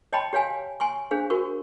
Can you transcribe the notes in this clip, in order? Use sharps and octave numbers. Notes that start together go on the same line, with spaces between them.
C#5 D#5 G5 A5 B5 C6
G4 C#5 F5 G#5
G#5 C6 C#6
D4 G#4 C5 F5
F#4 A#4 C#6